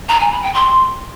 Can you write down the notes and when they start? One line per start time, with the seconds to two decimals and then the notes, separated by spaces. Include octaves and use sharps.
0.09 A#5
0.20 G#5
0.31 B5
0.43 G5
0.54 C6